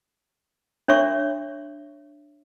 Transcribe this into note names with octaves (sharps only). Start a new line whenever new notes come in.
D4 C#5 E5 C#6